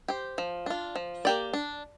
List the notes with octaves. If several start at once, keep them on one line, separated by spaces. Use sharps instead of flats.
G4 C5
F3
D4 F4
F3
A#3 G4 D5
D4